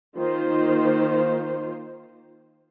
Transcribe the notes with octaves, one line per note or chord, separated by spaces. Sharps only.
D#3 A#3 F4 C5